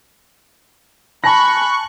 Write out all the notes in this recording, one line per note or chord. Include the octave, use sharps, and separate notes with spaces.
G#5 A5 B5 C#6 F#6 A#6